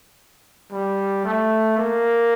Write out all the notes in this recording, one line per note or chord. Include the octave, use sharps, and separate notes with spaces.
G3
A3
A#3